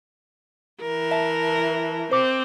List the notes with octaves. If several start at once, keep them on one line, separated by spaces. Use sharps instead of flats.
E3 A#4
E5 A5
C4 C5 D6